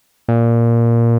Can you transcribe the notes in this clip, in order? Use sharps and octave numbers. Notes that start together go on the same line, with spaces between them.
A#2